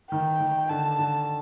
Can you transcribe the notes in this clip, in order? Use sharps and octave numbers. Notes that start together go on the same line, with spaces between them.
D#3 G5
D#3
D3 A5
D3